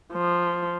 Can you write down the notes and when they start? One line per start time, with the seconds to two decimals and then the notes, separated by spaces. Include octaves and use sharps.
0.13 F3